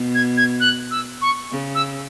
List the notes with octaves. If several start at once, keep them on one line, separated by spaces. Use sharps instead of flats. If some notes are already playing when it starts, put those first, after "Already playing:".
Already playing: B2
G#6
G#6
F#6
E6
C#6
C#3
E6